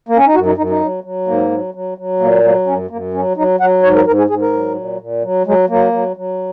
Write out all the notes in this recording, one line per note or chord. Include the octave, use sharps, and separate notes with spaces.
A#3
C#4
D#4
F#2 F#4
D#4
F#2 D#4
D#4
F#3
F#3
G#2 A#3
F#3
F#3
F#3
A#2 A#3
F#3 A#3
F#2 C#4
F#2 A#3
F#3 C#4
F#3 D#4
F#3 F#5
G#2 C#5
A#4
G#2 A#4
G#4
G#2 G#4
A#4
F#3
A#2
A#2
F#3
F#3 G#3
F#3 A#3
F#3
F#3